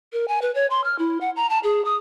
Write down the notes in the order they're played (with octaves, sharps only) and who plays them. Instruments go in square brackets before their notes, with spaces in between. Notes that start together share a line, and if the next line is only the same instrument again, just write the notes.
[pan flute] A#4
G#5
B4
C#5
C6
F6
E4
F#5
A#5
A5
G#4
D#6